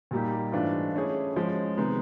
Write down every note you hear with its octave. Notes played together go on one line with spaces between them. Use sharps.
A#2 G3 A#3 D#4 G4
G#2 E3 A3 D4 F4
A3 C#4 E4 G#4
F3 G#3 C#4
C3 D#3 G#3 B3 D#4